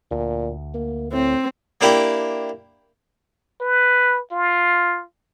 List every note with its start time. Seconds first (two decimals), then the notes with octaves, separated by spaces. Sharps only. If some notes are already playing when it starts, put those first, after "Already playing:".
0.11 D2 A#2
0.75 A#3
1.13 A2 C4
1.81 A#3 D4 E4 G4 G5
3.61 B4
4.31 F4